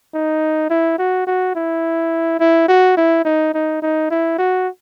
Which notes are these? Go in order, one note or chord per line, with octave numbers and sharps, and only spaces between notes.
D#4
E4
F#4
F#4
E4
E4
F#4
E4
D#4
D#4
D#4
E4
F#4